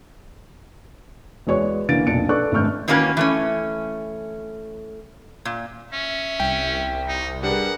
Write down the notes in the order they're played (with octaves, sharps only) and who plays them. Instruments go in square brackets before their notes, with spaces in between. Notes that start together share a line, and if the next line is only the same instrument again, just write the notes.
[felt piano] E2 G#3 F#4 C#5 D5 C#6
D3 E3 A#3 A6 D7
F1 B1 A#2 D4 C#7 D7
A4 B4 D5 C#6 D6 F#6
G#1 G2 A3 C#6 F6 G6
[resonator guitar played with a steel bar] D#3 E3 A#3 C#4 F#4 B4
E3 A3 C#4
A#2
[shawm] C#4 [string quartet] E5
[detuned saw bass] C2 [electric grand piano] G5
[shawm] D#4
[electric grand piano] G3 D4 [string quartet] G#4 A#4 B4 [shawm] F#5